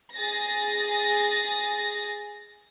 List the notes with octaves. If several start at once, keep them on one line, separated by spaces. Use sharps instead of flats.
G#4 A6 A#6